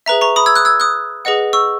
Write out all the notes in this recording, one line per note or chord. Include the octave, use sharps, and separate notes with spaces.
G#4 B4 E5 A#5
A#5 C#6
B5 D#6
E6 G#6
D#6 F#6
E6 G#6
D#6 F#6
G#4 B4 D#5 F#5
C#6 E6